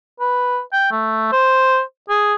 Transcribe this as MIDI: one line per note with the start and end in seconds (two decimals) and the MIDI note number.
0.21 0.60 71
0.73 0.89 79
0.92 1.29 57
1.32 1.81 72
2.09 2.35 68